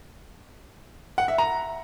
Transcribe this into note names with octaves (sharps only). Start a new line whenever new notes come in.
F#5
E5
A#5